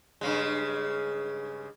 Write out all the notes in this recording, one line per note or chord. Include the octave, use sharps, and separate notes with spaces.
G2 C#3 G#3